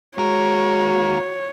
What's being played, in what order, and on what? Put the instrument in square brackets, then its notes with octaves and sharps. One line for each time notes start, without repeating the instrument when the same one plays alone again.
[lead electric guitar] D#2 A#4 [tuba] G#3 [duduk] F#4 [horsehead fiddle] C#5